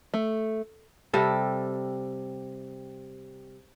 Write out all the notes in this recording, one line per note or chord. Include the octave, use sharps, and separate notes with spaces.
A3
C3 G3 A4